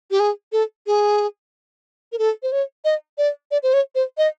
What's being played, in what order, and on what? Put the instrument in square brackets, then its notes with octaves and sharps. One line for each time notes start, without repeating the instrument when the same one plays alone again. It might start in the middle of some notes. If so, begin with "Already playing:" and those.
[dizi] G4
G#4
A4
G#4
A#4
A4
C5
C#5
D#5
D5
D5
C5
C#5
C5
D#5